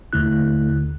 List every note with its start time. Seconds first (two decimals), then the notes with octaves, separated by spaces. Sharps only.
0.13 D#2 D3 A3 E4 F#6